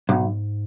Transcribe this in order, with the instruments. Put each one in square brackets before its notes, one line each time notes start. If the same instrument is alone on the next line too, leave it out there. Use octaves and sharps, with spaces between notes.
[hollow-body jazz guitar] B1 [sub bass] G#2